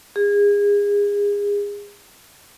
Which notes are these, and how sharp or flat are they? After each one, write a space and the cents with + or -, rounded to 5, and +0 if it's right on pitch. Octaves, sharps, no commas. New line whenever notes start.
G#4 -30